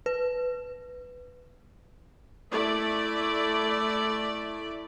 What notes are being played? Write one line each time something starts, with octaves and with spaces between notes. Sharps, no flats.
B4
A3 E4 D5